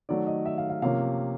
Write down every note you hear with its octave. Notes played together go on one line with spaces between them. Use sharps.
D#3 F#3 A3 D5
D#5
E5
F5
F5
C3 F3 A#3 C#4 F5